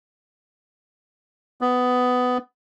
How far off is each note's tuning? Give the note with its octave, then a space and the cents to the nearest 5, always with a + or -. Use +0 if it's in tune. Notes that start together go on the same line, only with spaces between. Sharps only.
B3 +15